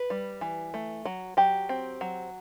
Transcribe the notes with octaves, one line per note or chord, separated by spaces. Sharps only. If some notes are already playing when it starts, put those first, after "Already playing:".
Already playing: B4
G3
E3
A3
F#3
F#3 G4
C4
F#3